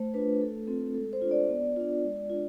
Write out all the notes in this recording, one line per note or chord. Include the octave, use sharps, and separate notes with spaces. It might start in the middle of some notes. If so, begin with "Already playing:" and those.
Already playing: A3 C5
D4 F4 B4
A3 A4
C4 F4 A4
G#3 A4
C5
D4 F4
D5
B3
D4 F4
G#3
D4 F4